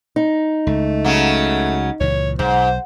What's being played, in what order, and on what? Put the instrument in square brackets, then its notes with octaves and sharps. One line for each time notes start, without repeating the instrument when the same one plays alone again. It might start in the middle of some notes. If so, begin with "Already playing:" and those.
[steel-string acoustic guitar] D#4
[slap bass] C#2 [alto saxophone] A3
[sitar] C#3 F#3
[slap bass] C#2 A#2 E3 [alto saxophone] C#5
[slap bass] B1 [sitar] G#2 [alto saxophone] C5